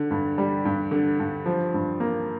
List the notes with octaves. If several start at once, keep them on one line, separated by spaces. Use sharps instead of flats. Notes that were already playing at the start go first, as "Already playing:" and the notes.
Already playing: D3
G2
G3
G2
D3
G2
F3
G2
A#3